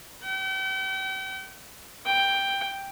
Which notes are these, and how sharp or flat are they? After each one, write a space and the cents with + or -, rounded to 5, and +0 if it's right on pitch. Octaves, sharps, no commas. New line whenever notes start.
G5 -40
G5 +5